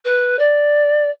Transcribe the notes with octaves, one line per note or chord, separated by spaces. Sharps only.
B4
D5